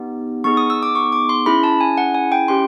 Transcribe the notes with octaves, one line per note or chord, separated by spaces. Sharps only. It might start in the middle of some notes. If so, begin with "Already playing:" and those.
Already playing: B3 D#4 G4
B3 D#4 G#4 C#6
D#6
E6
D6
C#6
D6
C6
C#4 E4 G#4 B5
A5
G#5
F#5
G#5
G5
C#4 E4 G4 C6